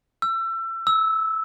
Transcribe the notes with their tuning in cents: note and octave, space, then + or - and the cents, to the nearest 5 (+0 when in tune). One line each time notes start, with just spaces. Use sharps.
E6 +30
E6 -15